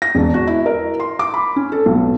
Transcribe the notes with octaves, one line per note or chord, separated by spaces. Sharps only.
A#6
E1
F#4
E4
A#4
C6
D6
B5
C#4
A4
B1